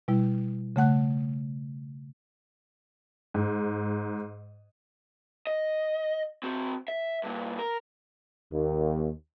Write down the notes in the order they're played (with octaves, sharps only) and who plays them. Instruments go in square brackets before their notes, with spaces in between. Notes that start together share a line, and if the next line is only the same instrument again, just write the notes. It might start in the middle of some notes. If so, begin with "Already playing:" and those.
[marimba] B2 G3 E4
C#3 A3 F#5 F#6
[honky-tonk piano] G#2
[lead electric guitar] D#5
C4 F#4
E5
G2 A#2
A#4
[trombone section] D#2